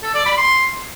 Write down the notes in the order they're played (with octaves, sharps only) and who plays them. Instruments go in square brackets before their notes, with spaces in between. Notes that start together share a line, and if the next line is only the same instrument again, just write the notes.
[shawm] A4
D5
B5
C6